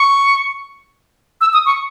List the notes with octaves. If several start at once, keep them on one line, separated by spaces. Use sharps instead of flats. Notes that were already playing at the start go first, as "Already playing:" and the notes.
Already playing: C#6
E6
D#6
C#6